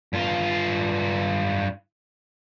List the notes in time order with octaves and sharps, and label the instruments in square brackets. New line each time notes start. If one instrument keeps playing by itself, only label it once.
[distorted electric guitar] G2 F4